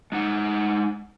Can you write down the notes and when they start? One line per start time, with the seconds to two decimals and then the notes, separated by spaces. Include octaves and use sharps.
0.12 G#3 D#4 F#5